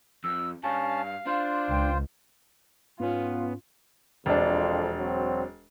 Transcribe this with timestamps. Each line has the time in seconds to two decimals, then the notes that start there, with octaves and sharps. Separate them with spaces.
0.24 F2 E6
0.64 G2 C#4 F5 A5
1.26 D4 F4 C5
1.70 C#2 G5
3.00 G#2 B3 C#4 F4
4.26 E1 F2 D4
4.99 F#3 C4